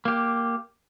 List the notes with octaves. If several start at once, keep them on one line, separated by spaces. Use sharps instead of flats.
A#3 G4